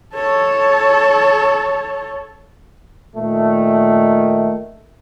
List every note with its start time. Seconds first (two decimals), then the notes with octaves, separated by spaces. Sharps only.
0.15 A4 C#5
3.16 A#2 D#3 A3